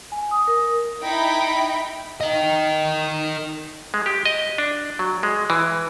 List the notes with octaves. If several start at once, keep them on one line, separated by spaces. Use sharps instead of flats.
G#5
D#6
A#4
D#4 E4 G5 B5
A#4 D#5
G#3
G4
D#5
D4
F#3
G#3
E3